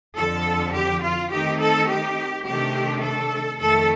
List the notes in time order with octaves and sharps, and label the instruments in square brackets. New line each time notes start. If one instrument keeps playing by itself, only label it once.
[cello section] F2 D3 F3 A4
G4
F4
D#3 A3 C4 D#4 G4
A4
G4
C3 D#3 A3 D4 G4
A4
F2 D#3 A3 A4